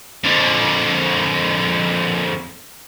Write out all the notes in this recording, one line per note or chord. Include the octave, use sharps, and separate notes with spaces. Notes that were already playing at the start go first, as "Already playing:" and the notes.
F2 D3